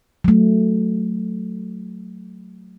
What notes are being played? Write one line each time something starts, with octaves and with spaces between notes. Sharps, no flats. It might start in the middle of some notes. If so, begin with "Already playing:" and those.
F#3 A3